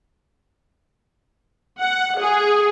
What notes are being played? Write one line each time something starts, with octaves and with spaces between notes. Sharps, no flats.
F#5
G#4